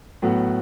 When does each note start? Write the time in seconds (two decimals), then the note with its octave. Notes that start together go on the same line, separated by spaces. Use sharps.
0.22 A2 F#3 B3